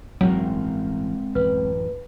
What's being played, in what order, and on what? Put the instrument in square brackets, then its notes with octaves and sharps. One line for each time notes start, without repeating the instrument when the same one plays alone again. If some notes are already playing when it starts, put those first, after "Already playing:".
[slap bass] A1 G2 [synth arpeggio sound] F#3 [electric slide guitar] G#3 C4 A#4
[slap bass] A1 F#2 [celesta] B4